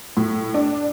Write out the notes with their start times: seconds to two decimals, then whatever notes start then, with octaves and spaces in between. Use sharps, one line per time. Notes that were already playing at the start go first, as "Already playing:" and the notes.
0.17 A2
0.54 D4